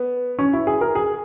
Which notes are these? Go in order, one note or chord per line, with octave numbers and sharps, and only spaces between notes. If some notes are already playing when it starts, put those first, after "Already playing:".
Already playing: B3
C#4
E4
G#4
A#4
G#4